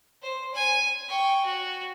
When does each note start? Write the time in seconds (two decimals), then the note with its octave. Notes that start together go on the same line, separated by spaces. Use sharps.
0.22 C5
0.54 G#5
1.09 G5 C#6
1.45 F#4